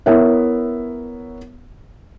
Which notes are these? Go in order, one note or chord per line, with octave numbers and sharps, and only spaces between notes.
B3 E4 A#4 C#5 E5